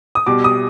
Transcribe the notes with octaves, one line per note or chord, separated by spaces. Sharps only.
D#6
B2 G3 D6
D#6